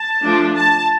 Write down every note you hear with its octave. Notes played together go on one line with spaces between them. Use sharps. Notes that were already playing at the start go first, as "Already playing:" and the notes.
Already playing: A5
F3 A3 D4
A5